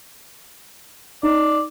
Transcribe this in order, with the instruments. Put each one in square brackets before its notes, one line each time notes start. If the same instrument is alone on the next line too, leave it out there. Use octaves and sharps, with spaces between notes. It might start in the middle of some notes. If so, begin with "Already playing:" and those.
[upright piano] D#4 [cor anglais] D5